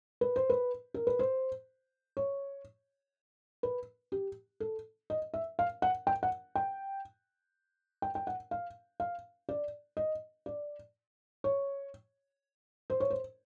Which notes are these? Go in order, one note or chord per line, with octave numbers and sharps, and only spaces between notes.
B4
C5
B4
A#4
B4
C5
C#5
B4
G4
A4
D#5
E5
F5
F#5
G5
F#5
G5
G5
G5
F#5
F5
F5
D5
D#5
D5
C#5
C5
C#5
C5